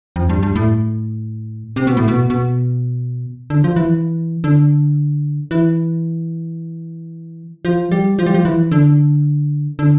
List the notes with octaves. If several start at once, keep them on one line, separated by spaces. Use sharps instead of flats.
F2
G2
G2
A2
C3
B2
A2
B2
B2
D3
F3
E3
D3
E3
F3
G3
F3
G3
F3
E3
D3
D3